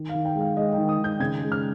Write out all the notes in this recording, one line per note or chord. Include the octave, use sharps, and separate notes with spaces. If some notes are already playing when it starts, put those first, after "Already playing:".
Already playing: D#3
F5
D#3
G5
G#3
F5
G#3 D#5
D#3 G5
D#6
D#3
G6
C#3 G#6
G#3
F6